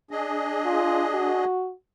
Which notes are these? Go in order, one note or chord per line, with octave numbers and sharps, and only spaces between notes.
D4 G#4 D#5
F4
F#4